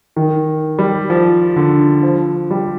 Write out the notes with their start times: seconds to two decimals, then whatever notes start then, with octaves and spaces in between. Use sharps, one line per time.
0.16 D#3
0.79 G3
1.10 F3
1.56 D3
2.03 F3
2.51 G3